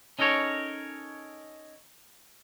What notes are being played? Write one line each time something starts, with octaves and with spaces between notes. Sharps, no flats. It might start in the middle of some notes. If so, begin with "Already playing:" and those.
C#4 D#4 A4 A#4 C#5